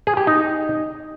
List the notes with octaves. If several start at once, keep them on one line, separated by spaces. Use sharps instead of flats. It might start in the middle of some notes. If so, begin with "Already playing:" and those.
G#4
G4
D#4